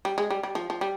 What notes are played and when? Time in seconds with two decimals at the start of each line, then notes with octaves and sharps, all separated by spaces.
0.05 G3
0.18 G#3
0.30 G3
0.43 G3
0.55 F3
0.70 F3
0.81 G3